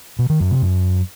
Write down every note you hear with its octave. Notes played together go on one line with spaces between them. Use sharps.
B2
D#3
F#2
C3
F#2